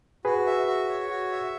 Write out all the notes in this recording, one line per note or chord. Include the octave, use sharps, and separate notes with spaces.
F#4 G#4 B4
E5
F#4
C#5
F#4
E5